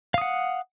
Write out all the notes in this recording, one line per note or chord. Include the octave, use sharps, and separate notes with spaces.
F5 F#5 D#6